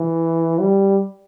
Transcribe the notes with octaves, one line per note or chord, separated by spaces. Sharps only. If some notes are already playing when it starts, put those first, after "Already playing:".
Already playing: E3
G3